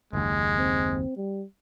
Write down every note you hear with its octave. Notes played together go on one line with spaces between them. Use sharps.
F#1 D#2 G#3
C4
G3